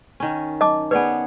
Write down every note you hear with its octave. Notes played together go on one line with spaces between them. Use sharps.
D#3 C#4
D#5 A5 D6
B3 G#4 B4 C#5 D5 G#5